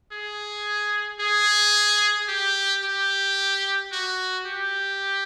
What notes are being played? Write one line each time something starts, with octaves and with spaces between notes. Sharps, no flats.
G#4
G#4
G4
G4
F#4
G4